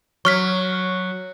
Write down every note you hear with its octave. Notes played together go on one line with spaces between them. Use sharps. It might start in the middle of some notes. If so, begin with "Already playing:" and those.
F#3 C#6 F6 B6